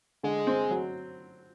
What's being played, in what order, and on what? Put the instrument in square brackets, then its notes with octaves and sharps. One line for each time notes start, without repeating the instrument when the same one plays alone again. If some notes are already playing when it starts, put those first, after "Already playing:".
[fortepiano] D3 [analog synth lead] G#3
[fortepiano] C4
F#3